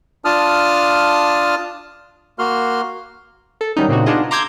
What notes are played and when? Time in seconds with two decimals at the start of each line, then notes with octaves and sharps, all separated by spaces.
0.25 D4 F4 A5 D#6 F6
2.39 A#3 F#4 C6 F6
3.61 A4
3.76 D#3 F#3 G3 C#4 D#4
3.88 A#2 C#3 C4 D4 D#4 F#4
4.06 B3 D4 D#4 F4 G#4 D#5
4.31 A#5 C6 D6 E6 G6 G#6